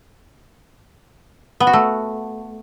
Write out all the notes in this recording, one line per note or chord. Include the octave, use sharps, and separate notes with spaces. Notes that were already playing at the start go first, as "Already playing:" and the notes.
B3
F#4
A3